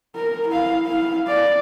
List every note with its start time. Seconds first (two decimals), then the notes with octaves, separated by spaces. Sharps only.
0.15 A#4
0.49 E4 F5
0.85 E4 F5
1.27 D5